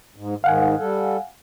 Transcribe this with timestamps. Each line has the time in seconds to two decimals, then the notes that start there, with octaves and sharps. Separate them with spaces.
0.16 G#2
0.44 G#2 D#3 F5 F#5 G#5
0.80 G3 A4